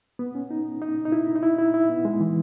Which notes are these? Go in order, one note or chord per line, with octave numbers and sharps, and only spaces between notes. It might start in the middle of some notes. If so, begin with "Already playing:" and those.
B3
C#4
D#4
D#4
D#4
E4
D#4
E4
D#4
E4
E4
B3
G#3
E3